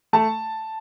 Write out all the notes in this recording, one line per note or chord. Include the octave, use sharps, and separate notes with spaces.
A3 A5